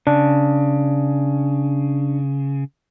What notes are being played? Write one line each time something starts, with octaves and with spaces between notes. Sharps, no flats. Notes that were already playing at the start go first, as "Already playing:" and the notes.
C#3 D4